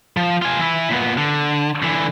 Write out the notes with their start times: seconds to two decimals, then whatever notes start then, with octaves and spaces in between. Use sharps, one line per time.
0.17 F3
0.42 F4 G#5
0.59 E3 E4
0.90 A#2 B3
1.17 D3
1.83 D3 E3